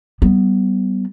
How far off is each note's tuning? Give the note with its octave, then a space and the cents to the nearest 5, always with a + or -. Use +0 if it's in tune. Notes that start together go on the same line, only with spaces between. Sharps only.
G3 -30 B3 +10